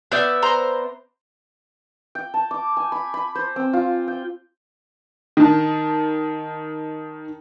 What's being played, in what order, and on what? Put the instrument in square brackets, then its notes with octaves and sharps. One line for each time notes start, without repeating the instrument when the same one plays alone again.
[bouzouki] B3 D5 E5 [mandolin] G6
[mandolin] C5 A#5
[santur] G5
A5
D6
G#5
B5
B5
C5
C4
F4
G5
[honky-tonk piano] D#3 A5